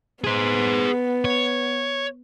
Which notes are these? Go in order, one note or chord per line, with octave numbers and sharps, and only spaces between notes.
B3 G#4 C5
C#5